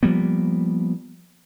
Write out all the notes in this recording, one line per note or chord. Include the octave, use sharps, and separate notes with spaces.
F3 G3 A#3 B3